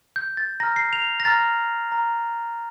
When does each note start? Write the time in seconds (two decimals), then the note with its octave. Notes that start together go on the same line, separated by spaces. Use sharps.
0.16 G6
0.37 A6
0.60 A#5 F6 A#6
0.76 C7
0.93 F7
1.20 A#6
1.25 A#5 F6 A6
1.92 A#5 F6